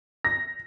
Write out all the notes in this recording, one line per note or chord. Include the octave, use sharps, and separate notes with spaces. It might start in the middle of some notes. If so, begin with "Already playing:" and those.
A#6